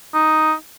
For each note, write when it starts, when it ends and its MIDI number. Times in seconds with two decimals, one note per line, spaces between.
0.14 0.53 63